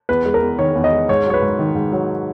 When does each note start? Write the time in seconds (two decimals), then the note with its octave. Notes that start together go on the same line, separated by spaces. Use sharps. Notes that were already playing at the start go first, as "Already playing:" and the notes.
0.09 E2 B4
0.26 G#3
0.34 A#4
0.43 E2
0.58 D#3 C#5
0.75 E2
0.84 D#5
0.92 G#3
1.09 G#2 C#5
1.26 F#3 C#5
1.34 B4
1.42 G#2
1.59 D#3
1.75 G#2
1.92 F#3